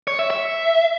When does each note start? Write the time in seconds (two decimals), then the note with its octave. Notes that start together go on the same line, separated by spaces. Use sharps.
0.07 C#5
0.19 E5
0.30 E5